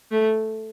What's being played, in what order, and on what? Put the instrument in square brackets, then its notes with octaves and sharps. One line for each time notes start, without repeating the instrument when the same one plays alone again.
[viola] A3